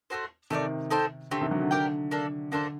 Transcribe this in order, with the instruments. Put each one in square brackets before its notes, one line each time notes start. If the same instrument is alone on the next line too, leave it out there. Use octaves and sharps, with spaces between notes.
[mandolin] A3 D#4 F#4 C5
[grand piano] C3 D#3 [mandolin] A3 D#4 A4 D5
[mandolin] D#4 A4 C5 G5
[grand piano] D3 [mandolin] A3 C4 G4
[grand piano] C3 D#3
D3 F#3
D3
[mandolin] G4 A#4 D5 G5
A#3 D4 A4
[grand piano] D3 [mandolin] A#3 D4 A4 C5